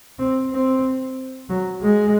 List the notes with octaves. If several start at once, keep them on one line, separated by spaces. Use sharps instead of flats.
C4
C4
F#3
G#3